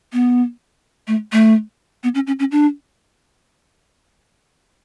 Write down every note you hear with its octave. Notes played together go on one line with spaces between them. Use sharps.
B3
A3
A3
B3
C#4
C#4
C#4
D4